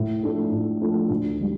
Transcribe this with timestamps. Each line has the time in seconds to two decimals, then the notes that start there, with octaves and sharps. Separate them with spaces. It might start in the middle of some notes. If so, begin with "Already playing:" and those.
Already playing: A2
0.23 F3 A3 D4 A4
0.52 A2
0.81 F3 A3 D4 A4
1.10 D2
1.39 D3 G3